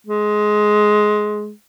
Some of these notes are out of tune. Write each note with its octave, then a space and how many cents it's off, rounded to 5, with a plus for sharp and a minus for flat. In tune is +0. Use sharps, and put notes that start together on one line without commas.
G#3 +15